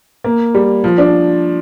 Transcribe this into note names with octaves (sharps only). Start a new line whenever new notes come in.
A#3
G3
F3
D4